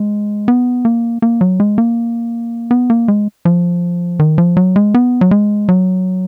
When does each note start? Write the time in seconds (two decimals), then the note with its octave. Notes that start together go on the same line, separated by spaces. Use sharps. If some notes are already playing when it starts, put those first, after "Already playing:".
Already playing: G#3
0.48 B3
0.85 A#3
1.22 A#3
1.41 F#3
1.60 G#3
1.78 A#3
2.71 B3
2.90 A#3
3.08 G#3
3.45 F3
4.19 D#3
4.38 F3
4.57 F#3
4.76 G#3
4.94 B3
5.21 F#3
5.31 G#3
5.69 F#3